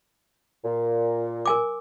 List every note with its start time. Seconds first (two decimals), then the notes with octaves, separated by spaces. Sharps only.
0.64 A#2
1.46 A#4 G#5 D6